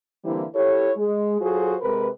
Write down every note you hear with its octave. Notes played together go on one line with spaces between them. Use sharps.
D3 E3 G3 A#3 C4 E4
E4 G4 A4 C#5
G#3
F#3 F4 F#4 G#4 A4 C5
C3 G#3 A#4 B4